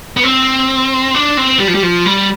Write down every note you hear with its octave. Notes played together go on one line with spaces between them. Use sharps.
B3
C4
D4
C4
G3
F3
G3
F3
G3